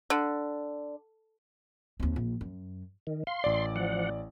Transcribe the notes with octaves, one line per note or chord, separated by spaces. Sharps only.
D3
D#2 C4
A#1
F#2
D#3
F5 C6
A1 D5
F3 F#5